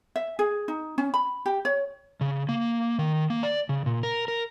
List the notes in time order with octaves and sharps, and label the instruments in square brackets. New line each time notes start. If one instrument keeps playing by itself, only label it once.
[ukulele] E5
G#4
D#4
C#4
B5
G4
C#5
[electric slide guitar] C#3
A#3
D#3
A#3
D5
C#3
A#2
A#4
A#4